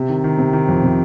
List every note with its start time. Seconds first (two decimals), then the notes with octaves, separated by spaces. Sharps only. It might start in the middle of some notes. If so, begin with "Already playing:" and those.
Already playing: C3
0.09 D#3
0.24 D#3
0.38 C3
0.53 D#3
0.68 F2
0.83 C3